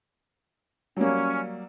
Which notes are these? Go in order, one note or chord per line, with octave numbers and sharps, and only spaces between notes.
F#3 G3 A#3 C#4